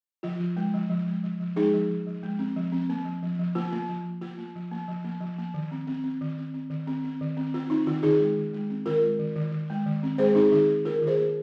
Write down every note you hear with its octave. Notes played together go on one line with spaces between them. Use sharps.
F3 F4
F3
G#3
F3
F3
G#3
F3
F3
G#3 D#4 G#4
F3
F3
F3
G#3
C4
F3
C4
A#3
F3
F3
F3
A#3 F4
A#3
F3
A#3
A#3 F4
A#3
F3
A#3
F3
A#3
F3
A#3
D#3
C4
C4
C4
D#3
C4
C4
D#3
C4
C4
D#3
C4
C4 F4
C4 D#4
D#3 F4
D#3 D#4 G#4
G#3
D#3
G#3
C4
D#3 F4 A#4
G#3
D#3
D#3
D#3
G#3
D#3
C4
G#3 G#4 C5
C4 D#4 G#4
D#3 D#4 G#4
D#3
A#3 F4 A#4
D#3
G#4 C5
A#3